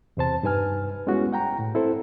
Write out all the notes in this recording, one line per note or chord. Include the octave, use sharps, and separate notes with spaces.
E2 C3 C5 A5
G2 D#4 B4 G#5 F6
G3 G#3 B3 C#4 E4 F#4
F#5 G5 A#5
A2
C4 E4 A4 C5